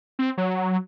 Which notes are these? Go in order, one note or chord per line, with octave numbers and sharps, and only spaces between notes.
C4
F#3